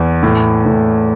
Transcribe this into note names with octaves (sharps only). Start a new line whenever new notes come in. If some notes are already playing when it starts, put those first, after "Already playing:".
Already playing: E2
A2
A2